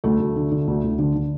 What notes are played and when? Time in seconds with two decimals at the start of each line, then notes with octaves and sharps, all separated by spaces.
0.04 D2 A3
0.20 D2
0.36 D3
0.52 D3
0.67 D2
0.84 D2
0.99 D3
1.15 D3